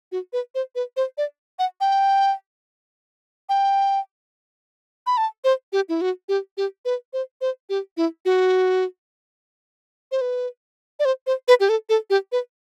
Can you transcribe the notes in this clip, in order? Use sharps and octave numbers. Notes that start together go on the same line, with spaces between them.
F#4
B4
C5
B4
C5
D5
F#5
G5
G5
B5
A5
C5
G4
E4
F#4
G4
G4
B4
C5
C5
G4
E4
F#4
C5
B4
D5
C5
C5
B4
G4
A4
A4
G4
B4